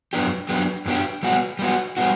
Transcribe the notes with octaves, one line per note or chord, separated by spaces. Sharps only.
F#2 F#3 B3 D4 G4
F#2 F#3 B3 D4 G4
F#2 F#3 B3 D4 G4
G3 B3 F#4
G3 B3 F#4
G3 B3 F#4